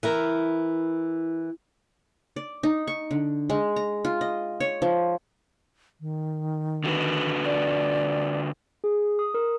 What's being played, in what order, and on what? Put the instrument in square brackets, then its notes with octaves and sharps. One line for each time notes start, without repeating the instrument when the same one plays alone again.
[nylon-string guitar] E3 E4 A#4
[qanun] D5
D#4
C#6
D3
G#3
A#5
F4
D#5
C#5
F3
[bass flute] D#3
[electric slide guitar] D3 F#4 B4
[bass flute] D5
[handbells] G#4
D#6
A#4